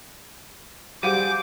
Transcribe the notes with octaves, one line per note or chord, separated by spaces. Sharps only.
G3 F#4 G#4 C5 F5 F#5 D6 G6